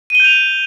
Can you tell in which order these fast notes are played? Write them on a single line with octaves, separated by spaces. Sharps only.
D#7 G7 G6 F7